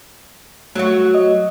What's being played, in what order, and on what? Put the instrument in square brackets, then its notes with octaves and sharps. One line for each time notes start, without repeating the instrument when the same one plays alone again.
[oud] F#3 F#4 [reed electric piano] A3
[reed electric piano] D#5